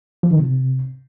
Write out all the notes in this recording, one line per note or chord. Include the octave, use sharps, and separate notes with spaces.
F3
D#3
C3